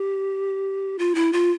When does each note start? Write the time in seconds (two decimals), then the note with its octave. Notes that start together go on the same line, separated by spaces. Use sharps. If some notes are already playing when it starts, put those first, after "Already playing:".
Already playing: G4
0.99 F4
1.15 E4
1.33 F4